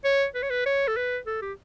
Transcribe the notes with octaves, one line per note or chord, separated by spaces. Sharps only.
C#5
B4
C#5
B4
C#5
A4
B4
A4
G4